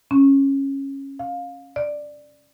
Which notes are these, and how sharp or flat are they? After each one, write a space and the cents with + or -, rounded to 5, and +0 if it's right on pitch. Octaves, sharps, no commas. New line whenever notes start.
C#4 -15
F5 +20
D5 +10